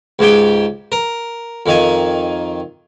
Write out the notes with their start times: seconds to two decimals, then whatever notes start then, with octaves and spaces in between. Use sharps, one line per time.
0.19 C#2 G#2 G4 G5
0.92 A#4
1.66 F2 D#3 G#5